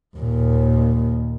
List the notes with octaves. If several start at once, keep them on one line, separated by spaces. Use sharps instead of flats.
D#2 A#2